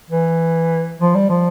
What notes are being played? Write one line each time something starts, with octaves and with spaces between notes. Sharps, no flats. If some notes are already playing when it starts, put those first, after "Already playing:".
E3
F3
G3
F3